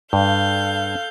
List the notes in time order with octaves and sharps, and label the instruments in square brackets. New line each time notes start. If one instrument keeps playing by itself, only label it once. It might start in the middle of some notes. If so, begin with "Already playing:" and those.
[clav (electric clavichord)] G2 [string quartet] A4 F5 G6